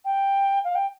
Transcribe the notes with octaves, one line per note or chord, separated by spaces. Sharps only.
G5
F5
G5